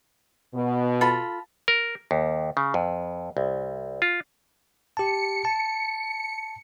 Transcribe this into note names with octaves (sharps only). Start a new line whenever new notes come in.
B2
F4 A4 B5
A#4
D#2
C#3
F2
C2
F4
G4 A5 C#7
A5